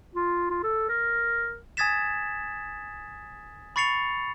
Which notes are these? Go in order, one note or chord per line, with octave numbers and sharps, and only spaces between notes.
F4
F4
A4
A#4
G#5 D#6 G#6 A6 B6 E7
B5 C#6 A6 C7 C#7 F7